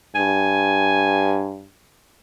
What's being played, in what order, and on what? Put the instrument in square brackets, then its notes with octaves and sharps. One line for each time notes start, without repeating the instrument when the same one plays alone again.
[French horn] G2 [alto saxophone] G#5